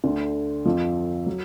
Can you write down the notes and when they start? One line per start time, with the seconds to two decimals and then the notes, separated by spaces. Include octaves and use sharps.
0.04 D2 D3
0.65 F2 F3
1.26 F#3